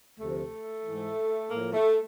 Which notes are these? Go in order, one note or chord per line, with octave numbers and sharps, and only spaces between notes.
D2 C3 F3 A3
G#2 E3
A2 F3 A#3
A3